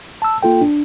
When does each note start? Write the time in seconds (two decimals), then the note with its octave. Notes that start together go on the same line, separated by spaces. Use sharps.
0.22 A5 E6
0.43 A#3 F4 A4 G5
0.61 D4